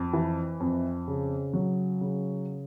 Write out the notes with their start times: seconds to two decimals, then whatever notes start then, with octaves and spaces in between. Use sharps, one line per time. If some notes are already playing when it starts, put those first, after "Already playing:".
Already playing: F2
0.13 E3
0.60 F2
1.08 C#3
1.54 F#3
2.01 C#3